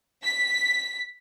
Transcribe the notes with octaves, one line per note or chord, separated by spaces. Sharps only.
B6